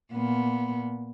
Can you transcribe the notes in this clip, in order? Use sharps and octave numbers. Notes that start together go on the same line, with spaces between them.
A#2 B3